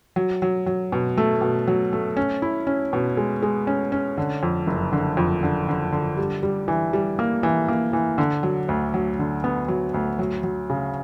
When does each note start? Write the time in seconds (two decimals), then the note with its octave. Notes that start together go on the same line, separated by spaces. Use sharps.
0.16 F#3
0.42 F#3
0.66 F#3
0.92 B2
1.17 A3
1.41 B2
1.67 F#3
1.93 A3
2.17 C#4
2.42 E4
2.67 C#4
2.93 B2
3.17 G#3
3.42 G#3
3.67 C#4
3.92 C#4
4.18 D3
4.43 F2
4.67 F#1
4.93 D3
5.17 F2
5.43 D3
5.69 D3
5.92 D3
6.17 G3
6.43 G3
6.68 E3
6.93 G3
7.19 A#3
7.43 E3
7.69 A#3
7.93 E3
8.18 D3
8.43 F#3
8.69 D2
8.94 F#3
9.19 D3
9.44 B3
9.68 F#3
9.94 D2
10.19 F#3
10.43 F#3
10.70 C#3